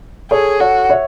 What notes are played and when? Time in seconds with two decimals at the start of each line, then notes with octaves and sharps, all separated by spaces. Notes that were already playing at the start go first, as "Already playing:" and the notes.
0.30 G#4 A4 C#5
0.60 F#4 A4 C#5
0.90 C#5 E5